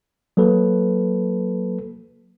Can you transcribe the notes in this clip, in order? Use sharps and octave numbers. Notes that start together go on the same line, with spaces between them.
F#3 A#3 A4 B4